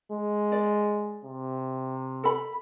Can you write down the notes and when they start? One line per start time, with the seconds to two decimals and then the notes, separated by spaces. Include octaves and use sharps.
0.12 G#3
0.52 D5
1.25 C3
2.24 A4 B5